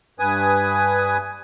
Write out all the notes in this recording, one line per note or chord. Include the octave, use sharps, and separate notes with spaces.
G2 B4 G#5 D#6